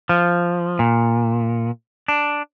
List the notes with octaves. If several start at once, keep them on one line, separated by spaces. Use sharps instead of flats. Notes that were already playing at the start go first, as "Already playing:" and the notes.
F3
A#2
D4